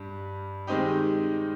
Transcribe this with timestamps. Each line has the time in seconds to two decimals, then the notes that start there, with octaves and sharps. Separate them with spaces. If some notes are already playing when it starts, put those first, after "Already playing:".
Already playing: G2 G3
0.67 D#3 G#3 C4 D#4 G4